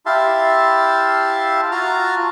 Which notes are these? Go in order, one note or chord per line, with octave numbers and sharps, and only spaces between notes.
E4 G4 E5 F5 A5 C6
F4 F#4 A5 A#5 F6